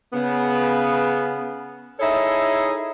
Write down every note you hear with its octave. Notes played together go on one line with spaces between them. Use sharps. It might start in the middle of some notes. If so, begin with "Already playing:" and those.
C#3 B3
D#4 E4 G#4 A4 C#5 E5